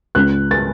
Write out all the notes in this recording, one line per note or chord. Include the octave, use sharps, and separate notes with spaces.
C#2 F#6
A6